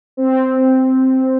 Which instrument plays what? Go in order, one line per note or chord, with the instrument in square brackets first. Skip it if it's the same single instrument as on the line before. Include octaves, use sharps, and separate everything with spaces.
[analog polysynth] C4